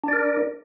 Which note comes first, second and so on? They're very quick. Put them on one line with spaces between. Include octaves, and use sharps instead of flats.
D4 D5 A#4